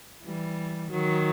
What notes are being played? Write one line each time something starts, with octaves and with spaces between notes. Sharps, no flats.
E3 G3
D#3 F#3